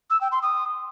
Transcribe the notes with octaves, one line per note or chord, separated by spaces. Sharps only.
E6
G5
C6
D#6